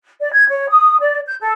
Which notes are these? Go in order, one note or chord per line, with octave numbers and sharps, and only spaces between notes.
D5
G#6
C#5
D#6
D5
G6
A4